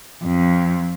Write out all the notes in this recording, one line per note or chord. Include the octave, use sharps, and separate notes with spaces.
F2